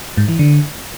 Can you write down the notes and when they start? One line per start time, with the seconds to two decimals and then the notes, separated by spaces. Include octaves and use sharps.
0.17 G#2
0.28 E3
0.39 D3